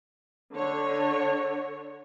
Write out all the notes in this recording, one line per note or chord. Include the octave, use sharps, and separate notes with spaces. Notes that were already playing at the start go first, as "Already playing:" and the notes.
D3 C#5